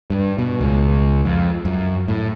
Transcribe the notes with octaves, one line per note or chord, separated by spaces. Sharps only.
G2
B2
C#2
F2
F#2
A2